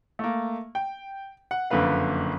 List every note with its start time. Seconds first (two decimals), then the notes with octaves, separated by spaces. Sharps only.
0.19 A3 A#3
0.75 G5
1.51 F#5
1.70 F#1 F2 D3 A#3 B4 F5